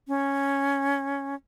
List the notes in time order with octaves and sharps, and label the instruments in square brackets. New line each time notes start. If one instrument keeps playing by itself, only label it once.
[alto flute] C#4